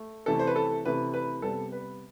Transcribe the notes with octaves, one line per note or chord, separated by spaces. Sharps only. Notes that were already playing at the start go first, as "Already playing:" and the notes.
Already playing: A3
C3 E3 A3 A4
C5
B4
A4
C3 E3 A3 B4
B4
C3 G3 B3 A4
B4